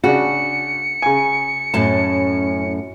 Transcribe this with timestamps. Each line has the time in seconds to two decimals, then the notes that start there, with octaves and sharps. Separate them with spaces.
0.04 C#3 D4 F#4 C#7
1.02 C#3 G#5
1.74 F#2 A2 C#4 A5